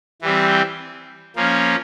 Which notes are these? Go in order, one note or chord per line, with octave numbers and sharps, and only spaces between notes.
E3 G3 C4
F3 A#3 C#4